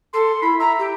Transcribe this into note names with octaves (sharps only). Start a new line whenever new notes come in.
A4 C6
E4 B5
E5 A#5
G4